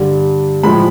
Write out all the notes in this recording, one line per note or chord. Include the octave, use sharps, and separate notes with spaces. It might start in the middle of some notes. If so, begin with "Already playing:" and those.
Already playing: G2 D3 G3
A2 F3 G#3 B5